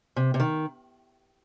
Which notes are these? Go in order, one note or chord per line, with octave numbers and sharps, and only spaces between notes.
C3
C3
D#3